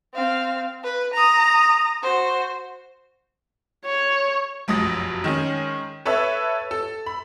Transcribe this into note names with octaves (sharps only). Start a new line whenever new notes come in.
C4 F5
B4
A#5 D#6
F#4 C5
C#5
F1 B1 F#2 D#6 A#6
D#3 G#3 C#4
A4 B4 C#5 E5 A5 E6
A4
B5